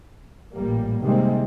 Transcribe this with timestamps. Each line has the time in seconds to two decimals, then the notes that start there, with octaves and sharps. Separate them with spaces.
0.52 A1 A#2 G3 A#3
1.01 C3 D#3 G3 G#3 A#3 C4